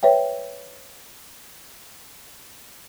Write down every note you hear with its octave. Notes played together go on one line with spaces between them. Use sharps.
B4 C#5 E5 G5